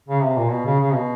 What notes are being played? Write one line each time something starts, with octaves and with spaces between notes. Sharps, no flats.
C#3
C3
A#2
B2
C#3
C#3
B2